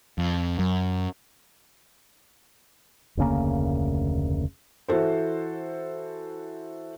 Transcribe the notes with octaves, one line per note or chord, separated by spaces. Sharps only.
F2
F#2
F1 D2 C#3 A#3
E3 F#4 A4 C5